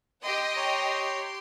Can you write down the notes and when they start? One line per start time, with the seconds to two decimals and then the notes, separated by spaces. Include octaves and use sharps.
0.23 G4 D#5 G5 C6
0.57 C#5 A#5